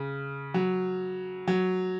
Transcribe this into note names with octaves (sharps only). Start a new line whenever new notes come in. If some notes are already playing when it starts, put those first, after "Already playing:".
Already playing: C#3
F#3
F#3